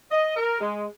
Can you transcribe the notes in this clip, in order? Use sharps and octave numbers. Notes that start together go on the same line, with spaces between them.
D#5
A#4
G#3